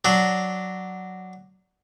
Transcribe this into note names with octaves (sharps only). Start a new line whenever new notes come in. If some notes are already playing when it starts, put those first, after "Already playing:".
F#3 D4